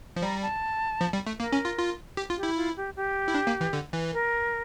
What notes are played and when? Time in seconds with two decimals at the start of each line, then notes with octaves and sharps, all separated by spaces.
0.16 F3
0.22 G3 A#5
0.42 A5
1.01 F3
1.13 G3
1.27 A3
1.39 A#3 A#4
1.52 C#4
1.65 F4
1.78 F4
2.17 G4
2.30 F4
2.37 G4
2.43 E4
2.56 F4
2.76 G4
2.96 G4
3.28 E4
3.34 D4
3.47 A#3
3.61 E3
3.73 D3
3.93 E3
4.13 A#4